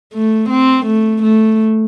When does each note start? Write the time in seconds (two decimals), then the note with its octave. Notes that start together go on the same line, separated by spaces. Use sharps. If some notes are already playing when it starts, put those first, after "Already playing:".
0.14 A3
0.50 C4
0.86 A3
1.23 A3